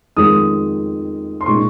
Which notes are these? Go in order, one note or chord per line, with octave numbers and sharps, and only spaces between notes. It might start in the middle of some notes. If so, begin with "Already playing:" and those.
F2 D#3 G#3 D#6
C6
A#2 G#3 D#4 C#6